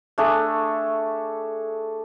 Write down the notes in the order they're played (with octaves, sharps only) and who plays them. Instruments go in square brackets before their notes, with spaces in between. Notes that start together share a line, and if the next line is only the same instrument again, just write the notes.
[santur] A3 D4 G#4 A4